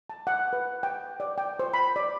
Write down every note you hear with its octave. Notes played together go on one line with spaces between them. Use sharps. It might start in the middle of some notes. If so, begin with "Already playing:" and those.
A5
F#5
B4
G5
D5
G5
C5
B5
D5